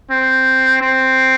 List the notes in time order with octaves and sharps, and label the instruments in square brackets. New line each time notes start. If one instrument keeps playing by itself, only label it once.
[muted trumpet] C4
C4